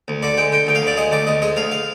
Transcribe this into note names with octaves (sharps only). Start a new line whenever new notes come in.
D2
D3 D5
G#3 G5
D3 G5
D2 G5
F5
D2 D5
G#3 D#5
D2 D5
D2 D#5
G#3 D#5
D2 F5
F5